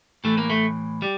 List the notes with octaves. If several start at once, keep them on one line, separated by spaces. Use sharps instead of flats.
A2 E3 A3
A#3
A3
G3